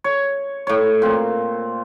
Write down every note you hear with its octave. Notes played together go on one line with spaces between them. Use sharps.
C#5
A2 C#5
A#2 C4